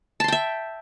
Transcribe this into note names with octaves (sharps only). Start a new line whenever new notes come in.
E5 G5 A5 C6